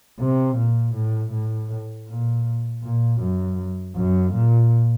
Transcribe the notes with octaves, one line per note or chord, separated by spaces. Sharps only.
C3
A#2
A2
A2
A#2
A#2
F#2
F#2
A#2